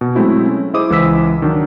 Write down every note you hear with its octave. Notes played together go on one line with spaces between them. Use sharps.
B2
F#3 G#3 A3 C4 E4 F#4
C#4
E4 G#4 C5 D#5 D6 D#6
C#2 E3 C5 E6 B6
D#3 F#3 D4